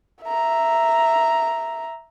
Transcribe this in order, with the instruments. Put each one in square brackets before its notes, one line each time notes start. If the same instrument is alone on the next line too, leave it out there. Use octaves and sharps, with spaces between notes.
[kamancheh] E5 A#5